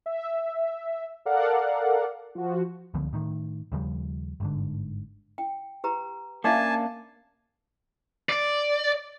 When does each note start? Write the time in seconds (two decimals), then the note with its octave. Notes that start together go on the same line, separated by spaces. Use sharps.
0.06 E5
1.26 A4 A#4 D5 F5 F#5
2.35 F3 F#4
2.94 C#2 D3 F3 B3
3.13 A2 D#3
3.72 D#2 C#3 F3 G3
4.40 G1 G#2 D3
5.38 G5
5.84 G4 B4 A#5
6.44 A#3 C#4 D4 E5 F5 G#5 A5 D6
8.29 D5